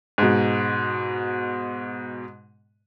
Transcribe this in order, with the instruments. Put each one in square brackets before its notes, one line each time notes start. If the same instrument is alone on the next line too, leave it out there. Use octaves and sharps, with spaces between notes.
[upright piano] G#2 B2